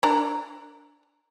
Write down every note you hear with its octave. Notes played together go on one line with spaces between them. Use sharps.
D4 A#4